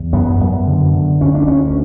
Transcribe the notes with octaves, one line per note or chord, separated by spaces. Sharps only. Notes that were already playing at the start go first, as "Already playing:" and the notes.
Already playing: E2
F#2 B3
F#2
D3
D3
D2 C#4
D4
D2 C#4